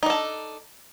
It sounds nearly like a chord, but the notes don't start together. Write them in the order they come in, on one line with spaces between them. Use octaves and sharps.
D#4 D4 A4